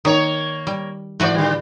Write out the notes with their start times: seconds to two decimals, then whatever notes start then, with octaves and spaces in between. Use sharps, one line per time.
0.05 D#3 A#3 C#5
0.67 G3
1.20 A2 E3 F#4 B4 D5
1.34 D3 G3